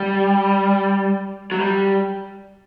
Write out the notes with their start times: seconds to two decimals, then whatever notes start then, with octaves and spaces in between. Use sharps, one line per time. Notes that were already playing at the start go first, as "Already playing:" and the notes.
Already playing: G3
1.52 F#3
1.60 G3